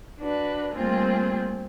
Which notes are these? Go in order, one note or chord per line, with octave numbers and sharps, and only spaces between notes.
D4 F#4 B4
G3 A3 A#3 C4 F4 G#4